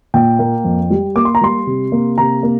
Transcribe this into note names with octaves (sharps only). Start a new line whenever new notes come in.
A#2 G5
A#3
F2
G3
A#3 D6
C6
A#5
G3 C6
C3
A#3
C3 A#5
A#3